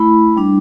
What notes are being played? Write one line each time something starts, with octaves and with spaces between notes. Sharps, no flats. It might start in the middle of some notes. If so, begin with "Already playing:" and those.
Already playing: A3 E4 B5
G3 D4